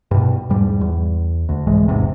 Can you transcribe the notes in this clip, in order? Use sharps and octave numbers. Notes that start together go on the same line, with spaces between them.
G2 B2
E2 G#2 G3
E2
D2
C2 G#2 E3 G#3
A1 E2 G#2 C3